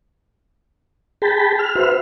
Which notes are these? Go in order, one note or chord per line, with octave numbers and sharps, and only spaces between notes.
G#4 G5 A5 B5
F6
F#4 B4 C5 E5 F6